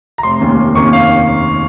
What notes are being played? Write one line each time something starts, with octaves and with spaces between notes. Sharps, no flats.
A#5
F1 C6
D#2 D#3 A#3 C#4
F1
D#2 D#3 A#3 C#4 C#6
F5